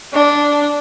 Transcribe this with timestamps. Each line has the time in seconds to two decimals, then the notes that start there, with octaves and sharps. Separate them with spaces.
0.13 D4